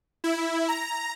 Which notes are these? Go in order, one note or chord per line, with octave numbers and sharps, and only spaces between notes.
E4
A#5